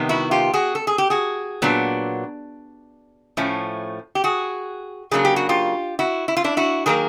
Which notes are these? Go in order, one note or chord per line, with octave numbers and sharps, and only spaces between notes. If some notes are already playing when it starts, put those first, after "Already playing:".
Already playing: C3 D#3 G3 B3
E4 F#4
F4 G4
F#4 G#4
A4
G#4
G4
F#4 G#4
A#2 F#3 B3 D4
A2 F3 A3 C#4
G4
F#4 G#4
C#3 F#3 A#3 D4 G#4
G4
F#4
F4 G4
E4 F#4
E4
F4
D4 E4
E4 F#4
D#3 F#3 A#3 G#4 A#4